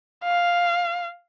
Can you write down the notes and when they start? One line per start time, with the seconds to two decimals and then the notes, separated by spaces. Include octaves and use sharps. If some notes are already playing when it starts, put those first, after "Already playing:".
0.24 F5